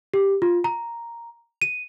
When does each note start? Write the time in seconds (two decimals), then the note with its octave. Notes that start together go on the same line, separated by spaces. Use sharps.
0.14 G4
0.42 F4
0.64 A#5
1.62 D#7